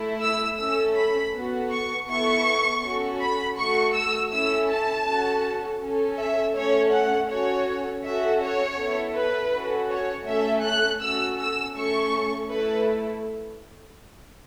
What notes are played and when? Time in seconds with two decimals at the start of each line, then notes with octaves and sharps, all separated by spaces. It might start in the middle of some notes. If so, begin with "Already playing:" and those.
Already playing: A3 E4 A4
0.22 E6
0.58 A3 C#4 A4 E6
0.96 B5
1.34 B3 F#4 A4
1.71 C#6
2.08 B3 E4 A4 C#6
2.83 C#4 F#4 A4
3.20 B5
3.57 A3 F#4 A4 C#6
3.94 E6
4.31 C#4 E4 A4 E6
4.69 A5
5.07 C#4 F#4 A4
5.80 C#4 A4
6.18 E5
6.55 A3 C#4 A4 C#5
6.92 F#5
7.30 C#4 F#4 A4 C#5
8.04 C#4 F#4 A4 E5
8.41 C#5
8.78 B3 E4 A4
9.16 B4
9.54 C#4 F#4 A4
9.90 C#5
10.27 A3 C#4 A4 E5
10.65 F#6
11.02 C#4 F#4 A4 E6
11.40 E6
11.77 A3 C#4 A4 C#6
12.51 A3 E4 A4 B4